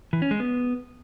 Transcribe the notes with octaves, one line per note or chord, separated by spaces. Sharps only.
E3
C#4
G#3
B3